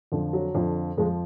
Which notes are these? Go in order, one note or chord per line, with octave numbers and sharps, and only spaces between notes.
F2 D3 F3
F#3
F2 D3 F3
F2 F3 G#3